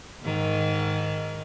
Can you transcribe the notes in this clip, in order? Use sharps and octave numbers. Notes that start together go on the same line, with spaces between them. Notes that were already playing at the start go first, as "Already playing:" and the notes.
G#2 D#3